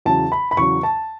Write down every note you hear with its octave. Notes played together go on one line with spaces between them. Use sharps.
E2 C#3 F#3 A5
B5
B5
E2 C#3 F#3 C#6
A5